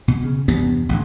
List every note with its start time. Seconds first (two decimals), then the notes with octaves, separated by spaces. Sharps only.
0.08 B2
0.24 C#3
0.48 E2 G2 C3 B3
0.89 A1 D3